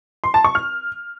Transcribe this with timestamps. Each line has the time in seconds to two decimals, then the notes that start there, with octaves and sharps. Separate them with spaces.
0.24 C6
0.34 A5
0.45 C#6
0.55 F6